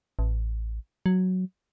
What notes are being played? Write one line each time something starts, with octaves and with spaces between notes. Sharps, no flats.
A1
F#3